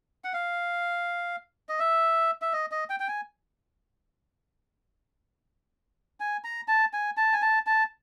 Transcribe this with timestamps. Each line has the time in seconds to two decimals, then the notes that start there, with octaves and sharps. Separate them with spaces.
0.24 F#5
0.33 F5
1.69 D#5
1.80 E5
2.42 E5
2.53 D#5
2.71 D#5
2.90 G5
3.00 G5
3.08 G#5
6.20 G#5
6.44 A#5
6.68 A5
6.93 G#5
7.17 A5
7.33 G#5
7.42 A5
7.66 A5